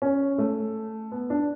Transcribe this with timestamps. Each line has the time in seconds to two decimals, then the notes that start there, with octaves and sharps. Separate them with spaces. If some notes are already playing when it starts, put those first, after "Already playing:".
0.02 C#4
0.38 A3
1.12 B3
1.30 D4